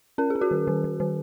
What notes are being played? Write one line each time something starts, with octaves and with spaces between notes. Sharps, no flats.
C#4 A#4
G#4
C#4
F#4 A#4
D#3
D#3
D#3
D#3